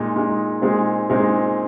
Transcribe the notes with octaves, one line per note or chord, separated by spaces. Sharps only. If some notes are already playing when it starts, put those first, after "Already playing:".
Already playing: A#2 G#3 D#4
A#2 G#3 D#4
A#2 G#3 C4 D#4 G#4
A#2 G#3 C4 D#4 G#4